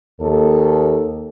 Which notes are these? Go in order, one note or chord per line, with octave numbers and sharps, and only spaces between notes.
D#2 A4